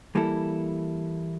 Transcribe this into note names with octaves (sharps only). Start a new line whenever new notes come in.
E3 G3 A#3 E4 A4